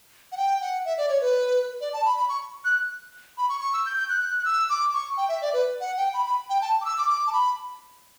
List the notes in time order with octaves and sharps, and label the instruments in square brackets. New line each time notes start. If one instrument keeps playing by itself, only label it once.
[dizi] F#5
G5
F#5
E5
D5
C#5
B4
D5
A5
B5
B5
C#6
F#6
B5
C#6
C#6
E6
G6
G6
F#6
F#6
F#6
E6
D6
C#6
G5
E5
D5
B4
F#5
G5
B5
B5
G5
A5
D6
E6
D6
D6
A5
B5